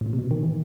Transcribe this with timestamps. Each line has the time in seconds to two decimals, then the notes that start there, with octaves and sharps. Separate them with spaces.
0.01 A2
0.06 A#2
0.13 C3
0.19 B2
0.31 D#3
0.43 E3